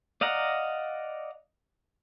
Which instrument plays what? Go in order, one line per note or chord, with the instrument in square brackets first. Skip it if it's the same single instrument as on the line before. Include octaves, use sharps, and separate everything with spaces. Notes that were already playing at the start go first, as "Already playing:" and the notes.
[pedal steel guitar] D5 D#5 F5 F#5 A#5